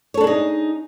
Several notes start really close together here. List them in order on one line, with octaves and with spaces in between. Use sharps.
C#5 A4 D4 G#4 D#4